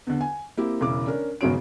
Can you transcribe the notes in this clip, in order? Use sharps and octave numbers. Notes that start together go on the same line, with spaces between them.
E2 D3
G#5
A#3 C4 E4 G4
E1 C#3 E4 D6
C#4 D4 A#4
G#1 E2 C#3 F#3 C#4 D7